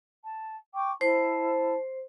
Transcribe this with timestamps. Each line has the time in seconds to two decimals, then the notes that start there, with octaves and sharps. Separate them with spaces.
0.24 A5
0.75 G5 C#6 D6
1.01 E4 C5 A5